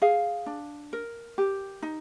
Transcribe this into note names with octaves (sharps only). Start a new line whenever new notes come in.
G#4 F5
D4
A#4
G4
D#4